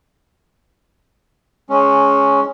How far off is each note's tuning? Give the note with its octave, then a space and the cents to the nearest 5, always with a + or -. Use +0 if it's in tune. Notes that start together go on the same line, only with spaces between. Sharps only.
G#3 +10 C#4 +0